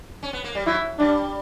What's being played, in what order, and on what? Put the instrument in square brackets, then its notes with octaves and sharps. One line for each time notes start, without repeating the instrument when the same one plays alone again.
[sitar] C#4
B3
A#3
G3
[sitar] F#3 [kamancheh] E4
[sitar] G3 [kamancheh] D4